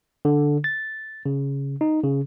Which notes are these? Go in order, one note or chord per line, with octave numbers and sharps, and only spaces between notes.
D3
A6
C#3
D#4
C#3